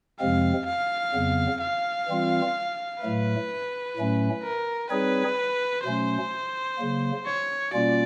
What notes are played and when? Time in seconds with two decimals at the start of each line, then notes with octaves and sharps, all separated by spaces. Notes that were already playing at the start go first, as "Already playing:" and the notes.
0.20 F2 C3 F3 G#3 C4 F5
0.67 F5
1.14 F2 C#3 F#3 B3
1.61 F5
2.08 E3 G3 C4 F4
3.02 A2 F#3 A3 B4
3.96 A2 F#3 A3 C#4
4.44 A#4
4.90 G3 C4 D#4 G#4 B4 C#5
5.84 B2 F#3 A3 C#4 C5
6.78 C#3 F#3 A#3
7.26 C#5
7.73 B2 G3 A#3 C#4 F4 D5